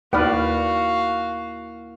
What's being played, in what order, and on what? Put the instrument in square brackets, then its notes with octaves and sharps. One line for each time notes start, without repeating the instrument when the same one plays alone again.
[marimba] D#2 F6 [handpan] A#3 E4 [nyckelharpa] F#4 F5 [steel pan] B4 D5